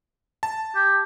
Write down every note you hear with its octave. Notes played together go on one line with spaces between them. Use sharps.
A5
G4